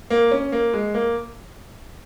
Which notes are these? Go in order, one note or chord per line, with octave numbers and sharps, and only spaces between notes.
A#3
C#4
A#3
G#3
A#3